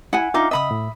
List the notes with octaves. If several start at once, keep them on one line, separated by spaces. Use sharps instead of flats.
E4 F#5 G#5
D4 D#4 F4 E5 F5 D6
C#3 D#5 E5 B5 D#6
A2